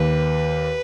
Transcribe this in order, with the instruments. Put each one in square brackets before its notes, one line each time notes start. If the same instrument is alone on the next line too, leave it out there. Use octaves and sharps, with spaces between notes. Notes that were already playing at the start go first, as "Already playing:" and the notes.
Already playing: [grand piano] D#2 [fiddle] B4